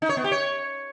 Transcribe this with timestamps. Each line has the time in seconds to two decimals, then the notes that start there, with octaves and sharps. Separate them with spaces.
0.02 D#4
0.09 C#5
0.17 B3
0.24 G4
0.32 C#5